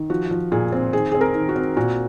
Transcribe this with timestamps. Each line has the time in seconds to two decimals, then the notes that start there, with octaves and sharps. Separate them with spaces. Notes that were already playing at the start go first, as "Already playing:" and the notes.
Already playing: D#3
0.10 F3 F#4
0.31 F3
0.52 A#2 G#4
0.72 C4
0.93 D#3 G#4
1.12 C4 G#4
1.21 A#4
1.35 D#3
1.49 F#4
1.56 C4
1.77 A#2 F#4